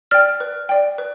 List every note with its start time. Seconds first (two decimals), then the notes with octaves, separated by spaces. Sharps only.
0.11 D5 G5 F6
0.40 B4
0.69 D5 G5
0.98 B4